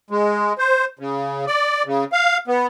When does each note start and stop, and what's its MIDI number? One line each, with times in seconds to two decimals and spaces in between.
0.11 0.53 56
0.58 0.85 72
0.99 1.45 49
1.47 1.83 74
1.86 2.04 49
2.12 2.37 77
2.48 2.67 59